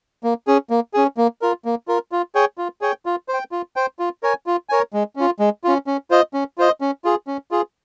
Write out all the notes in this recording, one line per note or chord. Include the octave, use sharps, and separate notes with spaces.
A#3
C#4 G#4
A#3
C#4 G#4
A#3
F4 A#4
A#3
F4 A#4
F4
G#4 C#5 G5
F4
G#4 C#5 G5
F4
C5
G5
F4
C5 G5
F4
A#4 C#5 G#5
F4
A#4 C#5 G#5
G#3
C#4 F4
G#3
C#4 F4
C#4
F4 C5 D#5
C#4
F4 C5 D#5
C#4
F4 G#4
C#4
F4 G#4